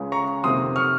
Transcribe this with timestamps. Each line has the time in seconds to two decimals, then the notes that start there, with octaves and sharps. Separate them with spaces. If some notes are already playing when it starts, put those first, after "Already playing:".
Already playing: C#2 C#3 G#3
0.12 A#5 C#6
0.44 F2 C3 D#3 A#3 C6 D#6
0.76 C#6 F6